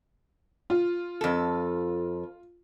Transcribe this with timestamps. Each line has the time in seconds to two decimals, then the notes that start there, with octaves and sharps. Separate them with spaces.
0.70 F4
1.21 F2 A4